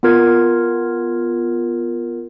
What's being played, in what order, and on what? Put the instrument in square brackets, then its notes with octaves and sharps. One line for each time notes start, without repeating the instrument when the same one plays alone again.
[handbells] B3 F4 A#4 G#6